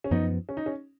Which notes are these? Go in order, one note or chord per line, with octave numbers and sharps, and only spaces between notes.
C#4
F#2 F3 B3 D#4
C#4
D#4
C#4